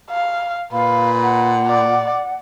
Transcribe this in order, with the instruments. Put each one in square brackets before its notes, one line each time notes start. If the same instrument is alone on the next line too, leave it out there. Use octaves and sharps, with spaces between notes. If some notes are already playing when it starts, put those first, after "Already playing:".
[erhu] F5
[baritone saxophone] A#2 [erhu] B4 [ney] F5
[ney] F#5
[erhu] D5